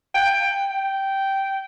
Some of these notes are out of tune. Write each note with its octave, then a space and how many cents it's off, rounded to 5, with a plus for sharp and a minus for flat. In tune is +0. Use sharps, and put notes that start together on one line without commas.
G5 +15
G5 -10